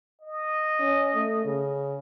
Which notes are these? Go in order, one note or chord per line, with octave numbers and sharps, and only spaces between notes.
D#5
C#4
A3
C#3